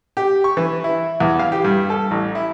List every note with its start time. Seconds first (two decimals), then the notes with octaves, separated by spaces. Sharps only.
0.17 G4
0.44 C#6
0.57 E3
0.84 E4
1.20 E2
1.39 F5
1.52 G4
1.64 G2
1.90 A4
2.11 A1
2.35 E4